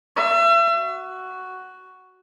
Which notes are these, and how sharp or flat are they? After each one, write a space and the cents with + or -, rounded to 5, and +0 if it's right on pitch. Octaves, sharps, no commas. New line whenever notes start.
E5 +35
F#4 +5